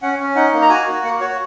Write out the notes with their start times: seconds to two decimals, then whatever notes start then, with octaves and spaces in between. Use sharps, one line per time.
0.02 C#4 F#5
0.19 C#4
0.35 D#4 F#5
0.53 A#3
0.62 A#5
0.69 F#4 G#5
0.87 F#4
1.04 A#3 F#5
1.20 F#4 C#5